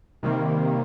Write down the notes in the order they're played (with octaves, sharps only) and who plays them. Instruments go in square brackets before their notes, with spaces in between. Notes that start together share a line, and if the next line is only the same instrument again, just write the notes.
[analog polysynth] C3 D#3 G3 A#3